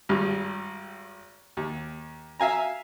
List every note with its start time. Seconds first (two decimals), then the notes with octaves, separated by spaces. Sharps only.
0.09 G#1 G2 G3
1.57 D#2
2.40 E5 F5 G#5 A#5